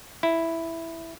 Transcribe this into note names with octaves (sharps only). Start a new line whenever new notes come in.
E4